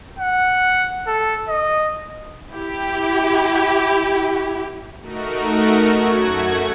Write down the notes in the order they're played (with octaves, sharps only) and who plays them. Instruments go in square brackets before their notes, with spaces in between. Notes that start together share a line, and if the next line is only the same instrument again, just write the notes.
[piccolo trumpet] F#5
A4
D#5
[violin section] E4 G4
[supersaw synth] A3 D#4 F#4 A#4
F#2 A3 F#4 G#6